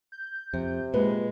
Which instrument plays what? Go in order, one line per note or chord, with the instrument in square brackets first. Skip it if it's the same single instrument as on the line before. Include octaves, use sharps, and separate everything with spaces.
[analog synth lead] G6
[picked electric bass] F2 [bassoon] C3
[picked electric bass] A#2 [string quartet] G#3 [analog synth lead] B4